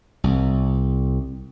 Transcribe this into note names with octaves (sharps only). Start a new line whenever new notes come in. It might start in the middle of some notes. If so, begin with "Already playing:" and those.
C2